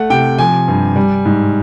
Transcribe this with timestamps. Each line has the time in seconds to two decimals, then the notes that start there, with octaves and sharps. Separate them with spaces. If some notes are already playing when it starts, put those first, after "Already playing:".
Already playing: A3 F#5
0.10 C3 G5
0.38 F3 G#5
0.68 G2
0.96 G3
1.25 G#2